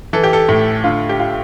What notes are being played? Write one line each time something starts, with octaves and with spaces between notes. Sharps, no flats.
E3 A4
G4
A4
A2
D3 F4
G4
F4